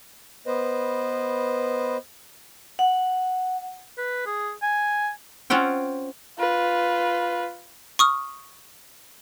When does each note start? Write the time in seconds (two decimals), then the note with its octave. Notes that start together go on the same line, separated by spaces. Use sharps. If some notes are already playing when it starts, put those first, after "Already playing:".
0.46 B3 B4 C5 D#5
2.79 F#5
3.98 B4
4.26 G#4
4.62 G#5
5.50 C4 C#4 F4 F#5 G5
6.39 F4 B4
7.99 C#6 D#6 F6